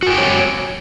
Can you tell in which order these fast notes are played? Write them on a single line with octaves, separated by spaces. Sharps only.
F#4 G#5 G5 G4 C#5